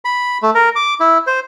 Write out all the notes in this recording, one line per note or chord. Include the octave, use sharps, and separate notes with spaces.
B5
A3
A#4
D6
E4
C5